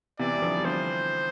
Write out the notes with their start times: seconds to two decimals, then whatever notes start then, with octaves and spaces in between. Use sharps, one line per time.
0.19 C3 E3 D5
0.36 G3
0.42 D3 F3
0.57 G3
0.65 D3 F3 C5